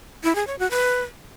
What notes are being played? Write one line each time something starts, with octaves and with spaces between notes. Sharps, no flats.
E4
G#4
C#5
F#4
B4